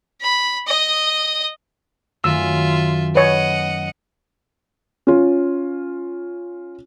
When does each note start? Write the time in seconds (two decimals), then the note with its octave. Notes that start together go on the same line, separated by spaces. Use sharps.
0.21 B5
0.67 D#5 D#6
2.24 F#2 D#3 A3 F4 E5 E6
3.15 B4 C#5 D#5 F#5
5.07 C#4 F4